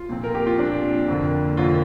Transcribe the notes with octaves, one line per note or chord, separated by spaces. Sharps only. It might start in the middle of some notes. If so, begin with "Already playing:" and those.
Already playing: F4
A#2 F3 C4
A#4
G4
F4
A#2 F3 C4 D4
F2 D3 A#3
F2 D3 A#3 F4